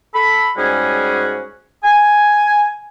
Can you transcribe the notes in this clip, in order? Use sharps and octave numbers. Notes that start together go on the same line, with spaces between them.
A4 B5
G#2 G3 C#4 F#4 G#4
G#5